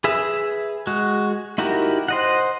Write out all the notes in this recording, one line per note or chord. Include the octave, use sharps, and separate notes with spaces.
G#4 B4 E5
G#3 F#4
D#4 E4 F#4 G4 A#4
C5 D#5 F#5